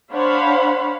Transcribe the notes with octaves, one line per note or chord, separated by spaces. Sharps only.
D4 C5 C#5 F5 F#5 B5